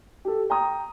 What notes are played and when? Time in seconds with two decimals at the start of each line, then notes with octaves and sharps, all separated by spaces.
0.25 G4 A4
0.50 G5 A#5 D#6